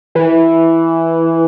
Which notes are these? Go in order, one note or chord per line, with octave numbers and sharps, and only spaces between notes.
E3